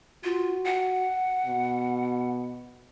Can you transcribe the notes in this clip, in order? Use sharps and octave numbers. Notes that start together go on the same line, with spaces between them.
F4 F#4
F#5
B2